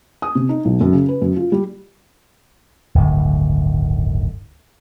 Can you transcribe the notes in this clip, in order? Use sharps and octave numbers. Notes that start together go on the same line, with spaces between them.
D#6
C3
D#4
B1
F#2
C#3
B4
F#2
F4
G3
D1 G1 D2 D#3